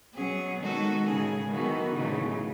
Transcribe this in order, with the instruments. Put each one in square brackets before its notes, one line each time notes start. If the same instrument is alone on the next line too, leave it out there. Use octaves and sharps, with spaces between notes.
[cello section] B2 [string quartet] F#3 C#4 G#4
[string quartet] D#3 G#3 D#4 F#4 A4
[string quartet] A2 G#3 C#4 G#4 [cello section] C#3
[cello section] D#3 F#3 [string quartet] E3 B3 D#4 F#4 A4
[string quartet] A2 F#3 A3 D#4 [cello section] C#3 E3